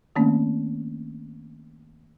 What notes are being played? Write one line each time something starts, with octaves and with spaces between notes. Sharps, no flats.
D#3 A3 A#3 C4 C#4